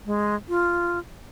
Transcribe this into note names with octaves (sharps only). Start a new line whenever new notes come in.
G#3
F4